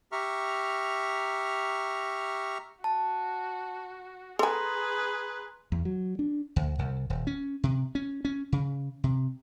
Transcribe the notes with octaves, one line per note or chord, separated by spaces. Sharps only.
G4 E5 A#5 C#6 F6
F#4 A5
G#4 A4 B4 G#5 A#5 C6
E2
F#3
D4
D2
C2
D#1
C#4
C3
C#4
C#4
C#3
C3